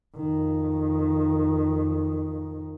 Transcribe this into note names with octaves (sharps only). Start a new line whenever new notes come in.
F2 D#3